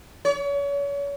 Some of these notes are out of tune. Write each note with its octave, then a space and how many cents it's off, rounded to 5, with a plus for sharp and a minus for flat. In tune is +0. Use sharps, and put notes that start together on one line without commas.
C#5 +35